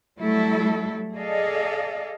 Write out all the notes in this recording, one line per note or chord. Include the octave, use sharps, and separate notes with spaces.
F#3 G3 A3 E4 A4
G#4 A4 D5 D#5 F5